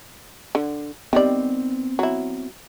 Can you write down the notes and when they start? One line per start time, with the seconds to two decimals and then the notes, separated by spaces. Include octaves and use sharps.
0.55 D3
1.13 D#3 G3 B3 C4 D5
1.99 F#3 E4